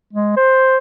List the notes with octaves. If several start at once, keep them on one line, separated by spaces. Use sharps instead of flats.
G#3
C5